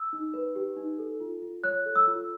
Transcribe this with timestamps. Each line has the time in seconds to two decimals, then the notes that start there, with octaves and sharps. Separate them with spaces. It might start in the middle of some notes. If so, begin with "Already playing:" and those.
Already playing: E6
0.13 D#4
0.34 B4
0.55 G4
0.76 D#4
0.99 A4
1.20 F4
1.42 F4
1.63 C#5 F#6
1.86 A4
1.96 E6
2.07 F4